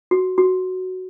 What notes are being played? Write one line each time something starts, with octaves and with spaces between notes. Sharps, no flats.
F#4
F#4